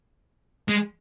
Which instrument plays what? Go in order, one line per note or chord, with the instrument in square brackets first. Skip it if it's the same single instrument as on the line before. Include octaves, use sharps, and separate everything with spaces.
[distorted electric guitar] G#3